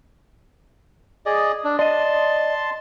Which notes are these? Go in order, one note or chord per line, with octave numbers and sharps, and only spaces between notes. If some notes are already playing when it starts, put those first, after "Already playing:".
G#4 D5 D#5
D4
D5 D#5 A5 C6